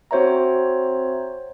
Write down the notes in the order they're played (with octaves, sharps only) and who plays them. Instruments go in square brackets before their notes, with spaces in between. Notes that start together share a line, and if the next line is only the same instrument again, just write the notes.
[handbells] C4 F#4 C5 C#5 E5 A#5